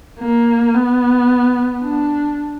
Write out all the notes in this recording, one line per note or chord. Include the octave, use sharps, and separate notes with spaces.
A#3
B3
D4